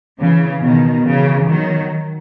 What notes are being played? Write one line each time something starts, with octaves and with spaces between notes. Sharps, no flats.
C#3 E3
B2 D#3
C#3 E3
D#3 F#3